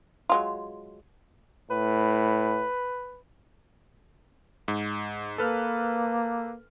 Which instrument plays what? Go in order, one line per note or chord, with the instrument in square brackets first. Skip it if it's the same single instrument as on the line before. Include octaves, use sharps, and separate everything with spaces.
[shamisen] F#3 G#3 F4
[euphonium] A2 [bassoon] B4
[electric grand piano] G#2
[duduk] A#3 [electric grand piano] A4 B4 F6